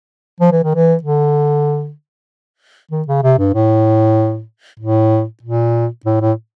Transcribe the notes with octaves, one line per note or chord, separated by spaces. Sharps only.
F3
E3
D#3
E3
D3
D#3
C#3
C3
G2
A2
A2
A#2
A2
A2